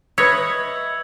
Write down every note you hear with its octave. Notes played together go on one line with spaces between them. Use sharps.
B4 C#5 D#5 E5 E6 G#6